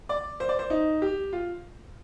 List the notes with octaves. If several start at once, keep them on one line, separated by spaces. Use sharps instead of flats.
D5
C5
D5
C5
D#4
G4
F4